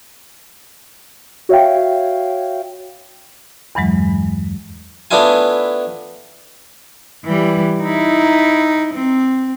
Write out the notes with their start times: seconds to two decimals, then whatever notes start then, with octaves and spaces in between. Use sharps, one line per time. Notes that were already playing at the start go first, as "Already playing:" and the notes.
1.49 F#4 C#5 E5 F5 G5
3.75 E2 G2 E3 F#3 G#3
5.11 A3 B3 D4 E4 F4 G#5
7.25 E3 G3
7.82 D#4 E4
8.94 C4